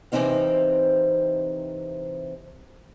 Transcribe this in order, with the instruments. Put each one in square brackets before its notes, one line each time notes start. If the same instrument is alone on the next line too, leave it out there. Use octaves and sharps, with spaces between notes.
[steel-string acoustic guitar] C3 E3 A3 C4 D#4 F5